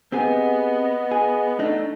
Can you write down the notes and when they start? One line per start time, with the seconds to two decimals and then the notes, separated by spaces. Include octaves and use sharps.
0.12 B3 C4 G4 G#4 D#5
1.11 G#4
1.59 A3 D4 D#4